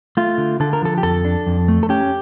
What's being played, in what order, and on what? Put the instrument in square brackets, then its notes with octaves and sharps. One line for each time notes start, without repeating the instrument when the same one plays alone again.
[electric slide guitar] A3 F4
D3
D3 A4
A#4
F3 A4
G4
F2 A4
D4
F2
A3
A4
C#4 G4